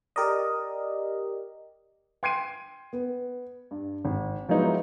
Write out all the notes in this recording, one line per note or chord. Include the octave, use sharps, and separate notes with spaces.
G4 A#4 D5 D#5
G5 C6 G#6 C7 D7 D#7
B3
G2
G#1
F3 F#3 G#3 B3 D#4 E4